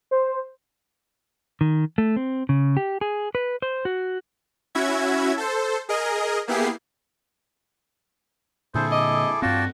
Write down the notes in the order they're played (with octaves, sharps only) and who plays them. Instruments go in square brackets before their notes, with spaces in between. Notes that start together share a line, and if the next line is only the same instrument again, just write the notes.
[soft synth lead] C5
[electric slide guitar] D#3
A3
C4
C#3
G4
G#4
B4
C5
F#4
[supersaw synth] C#4 E4 F#4 E5 G#6
A4 C5
G#4 A#4 D#5
A#3 B3 E4 G4 G#4 C7
[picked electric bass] A#2 D3 [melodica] E4 G#4 A4 [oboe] C5
[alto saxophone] D#5 [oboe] D6
[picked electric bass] G2 C4 [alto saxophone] F4 [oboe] F#4 [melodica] D5 G5 A5